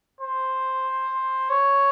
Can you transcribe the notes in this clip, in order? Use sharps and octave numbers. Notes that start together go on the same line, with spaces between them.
C5
C#5